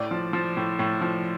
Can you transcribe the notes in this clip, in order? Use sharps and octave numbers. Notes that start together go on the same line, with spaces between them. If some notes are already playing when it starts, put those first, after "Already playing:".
Already playing: A2 D5
F3
F3
A2
A2
F3